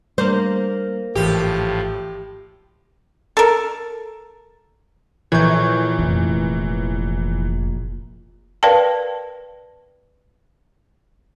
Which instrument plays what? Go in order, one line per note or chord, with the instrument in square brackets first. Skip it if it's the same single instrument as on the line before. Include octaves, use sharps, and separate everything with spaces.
[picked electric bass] G3 D4 [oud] A#3 C5
[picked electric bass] G#1 E3 [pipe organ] A2 F3 [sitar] G4
[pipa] A4 A#4
[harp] A#1 C#5 [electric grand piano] E3 G6
[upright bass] F1
[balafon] A#4 B4 D5 F5 G5 A5